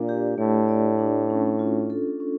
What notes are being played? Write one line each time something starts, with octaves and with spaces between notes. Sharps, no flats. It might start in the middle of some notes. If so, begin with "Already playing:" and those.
Already playing: A#2 D4 D5
G4
A2 A3
D5
D4
C#4
F4
A4
C#4